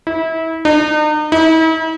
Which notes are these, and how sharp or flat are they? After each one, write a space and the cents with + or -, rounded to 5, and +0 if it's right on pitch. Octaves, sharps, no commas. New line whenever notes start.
E4 -30
D#4 -40
E4 -45